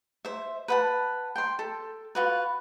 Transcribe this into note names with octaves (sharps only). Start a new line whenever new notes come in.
C5 E5
B4 F#5 A5
G5 C6
A4
F4 F#4 B4